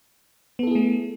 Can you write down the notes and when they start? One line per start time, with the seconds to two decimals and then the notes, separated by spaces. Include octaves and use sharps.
0.59 B3
0.63 A4
0.67 E4
0.71 G#4
0.75 A3